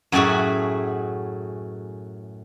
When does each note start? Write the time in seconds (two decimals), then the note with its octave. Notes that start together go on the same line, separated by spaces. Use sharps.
0.12 F#2 A2 F#3 F#4 G#4 E5